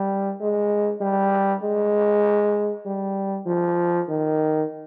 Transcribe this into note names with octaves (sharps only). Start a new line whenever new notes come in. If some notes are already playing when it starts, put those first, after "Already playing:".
Already playing: G3
G#3
G3
G#3
G3
F3
D#3